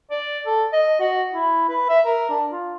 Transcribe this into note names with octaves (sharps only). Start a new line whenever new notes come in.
D5
A4
D#5
F#4
E4
B4
E5
A#4
D4
F4